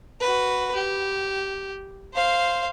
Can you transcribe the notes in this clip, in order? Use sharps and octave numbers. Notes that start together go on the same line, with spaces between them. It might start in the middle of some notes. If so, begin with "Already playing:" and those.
F#4 B4
G4
C5 F5